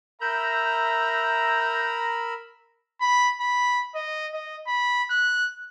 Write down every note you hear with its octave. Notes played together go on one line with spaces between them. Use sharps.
A#4 E5 A#5 B5 E6 G6
B5
B5
D#5
D#5
B5
F#6